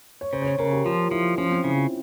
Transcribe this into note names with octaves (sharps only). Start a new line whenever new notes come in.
C#5
C#3 C5
C#5
C5
C#3 A#4
G4
F3 F4
F3 E4
F3 C#4
C4
C#3 E4
F4